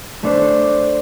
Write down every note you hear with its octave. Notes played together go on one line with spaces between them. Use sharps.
A3 D4 C5